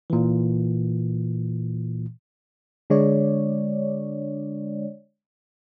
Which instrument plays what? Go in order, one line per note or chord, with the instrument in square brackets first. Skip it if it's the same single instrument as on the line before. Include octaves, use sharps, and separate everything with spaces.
[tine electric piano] A#2 E3
[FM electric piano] D3 G#3 D4 C#5 D5